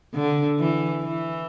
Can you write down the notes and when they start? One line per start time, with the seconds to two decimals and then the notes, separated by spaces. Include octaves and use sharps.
0.14 D3
0.59 E3
1.03 E3